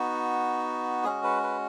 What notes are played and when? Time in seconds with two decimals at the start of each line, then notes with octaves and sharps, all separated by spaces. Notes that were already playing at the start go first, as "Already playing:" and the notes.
Already playing: B3 D#4 F#4
1.04 G#3 C#4 F#4 G#4
1.23 B4
1.43 B4